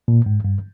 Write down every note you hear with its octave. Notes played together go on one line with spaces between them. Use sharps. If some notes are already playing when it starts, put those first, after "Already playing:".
A#2
G#2
G2